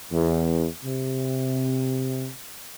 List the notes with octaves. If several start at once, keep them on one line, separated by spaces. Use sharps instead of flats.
E2
C3